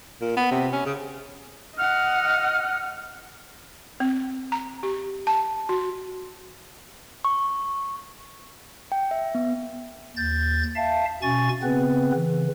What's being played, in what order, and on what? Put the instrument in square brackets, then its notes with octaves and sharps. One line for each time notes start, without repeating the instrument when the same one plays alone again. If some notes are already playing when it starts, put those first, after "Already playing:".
[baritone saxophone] A#2
B3
C3
C#4
C#3
[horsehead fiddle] D#5 F#5 [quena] F6
[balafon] C4
A#5
G4
A5
F#4
[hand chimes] C#6
G5
E5
B3
[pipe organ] D#2 G6 A6
E5 F5 A5
B2 C#4 G#5 C#6 A6
C#3 B3 C4 B4
C#3 E3